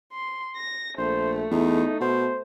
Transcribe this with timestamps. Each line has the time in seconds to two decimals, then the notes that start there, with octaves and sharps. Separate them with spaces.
0.13 C6
0.57 A#6
0.98 A#1 A3 C5
1.51 E2 D#4
2.01 B2 C5